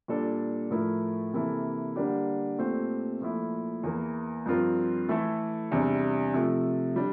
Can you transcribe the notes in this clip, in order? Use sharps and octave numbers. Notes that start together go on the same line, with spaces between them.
A#2 G3 D4 A4
A2 F3 A3 E4 A#4
C3 E3 A#3 E4 A4
D3 G3 A#3 D4 G4
A#2 A3 C4 G4 C5
A#2 F3 A3 E4
E2 E3 A#3
G2 F3 C4 F4 A#4
E3 A3 E4 A4
E2 C3 G3 D4
C3 F3 A3
G3 D4